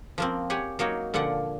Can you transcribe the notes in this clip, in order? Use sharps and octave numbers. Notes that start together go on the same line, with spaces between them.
F3 A#3 C4
G4 C#5 F#5 G#5
F#3 A#3 D#4 C#5
A#2 D3 F3 D5 F#5